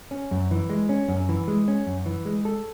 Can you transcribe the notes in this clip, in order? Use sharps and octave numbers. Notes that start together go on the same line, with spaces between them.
C#4
F#2
E3
G#3
C#4
F#2
E3
G#3
C#4
F#2
E3
G#3
A4